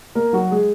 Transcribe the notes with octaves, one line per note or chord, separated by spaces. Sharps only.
A#3 A#4
F#3 F#4
G#3 G#4